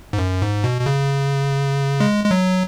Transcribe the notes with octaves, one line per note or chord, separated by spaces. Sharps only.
G#2
F#2
G#2
B2
B2
C#3
G#3
G#3
F#3